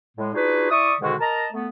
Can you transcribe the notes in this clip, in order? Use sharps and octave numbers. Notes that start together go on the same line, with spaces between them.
A2 G#3
D4 D#4 F4 F#4 G#4 B4
E4 D5 E5 C#6 D#6
G#2 B2 D3 D#3 G#3 F#4
A#4 D#5 A5 A#5
A3 B3